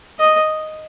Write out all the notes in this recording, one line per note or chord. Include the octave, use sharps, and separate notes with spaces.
D#5